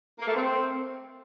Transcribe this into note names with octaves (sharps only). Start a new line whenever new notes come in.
A#3
A3
C4